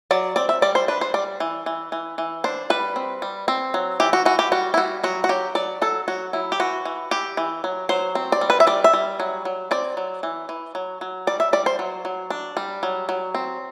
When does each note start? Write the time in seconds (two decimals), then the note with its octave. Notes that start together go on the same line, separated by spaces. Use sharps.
0.11 F#3 D5
0.36 C4 D5
0.49 E5
0.62 G3 D5
0.75 C5
0.88 D4 B4
1.01 C5
1.14 G3 D5
1.40 E3
1.66 E3
1.92 E3
2.18 E3
2.44 D4 C5
2.70 G3 B4
2.96 C4
3.22 G3
3.48 C4
3.74 F#3
4.00 E3 G4
4.13 F#4
4.25 E3 F#4
4.39 G4
4.52 G3 F#4
4.74 E4
4.77 G3 F#4
5.04 F#3 F#4
5.24 F#4
5.29 F#3 G4
5.55 F#3 D5
5.82 F#3 A4
6.08 F#3 F#4
6.33 F#3 E4
6.52 G4
6.60 E3 F#4
6.85 E3
7.11 E3 G4
7.37 E3
7.64 F#3
7.89 F#3 C5
8.15 C4
8.32 D5
8.41 G3
8.50 B4
8.60 E5
8.67 G3 D5
8.84 E5
8.93 G3
9.20 F#3
9.45 F#3
9.71 C4 D5
9.97 F#3
10.23 E3
10.49 E3
10.75 F#3
11.01 F#3
11.27 G3 D5
11.40 E5
11.53 G3 D5
11.66 C5
11.79 F#3
12.05 F#3
12.30 D4
12.57 G3
12.83 F#3
13.09 F#3
13.35 C4